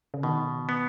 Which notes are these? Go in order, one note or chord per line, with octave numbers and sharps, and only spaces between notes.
C#3
B2 D#3
B3